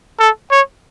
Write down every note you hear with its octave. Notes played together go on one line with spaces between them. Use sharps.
A4
C#5